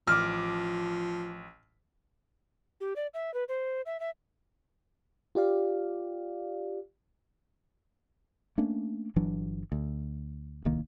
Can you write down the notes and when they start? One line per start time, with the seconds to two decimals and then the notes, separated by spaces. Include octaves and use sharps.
0.07 A1 F3 D6 F6
2.80 G4
2.96 D5
3.14 E5
3.34 B4
3.48 C5
3.86 E5
4.00 E5
5.35 F4 G4 D5 F5
8.58 A3 A#3 C#4 D4
9.16 G1 E3 F#3 D4
9.72 D2
10.65 D1 C2 D#3 A#3